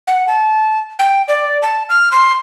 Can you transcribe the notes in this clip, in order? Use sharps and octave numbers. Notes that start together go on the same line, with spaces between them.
F#5
A5
G5
D5
A5
F6
C6